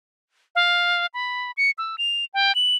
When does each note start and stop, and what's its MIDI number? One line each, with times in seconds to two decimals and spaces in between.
0.55 1.06 77
1.14 1.51 83
1.57 1.71 97
1.78 1.96 88
1.98 2.25 101
2.34 2.54 79
2.55 2.76 102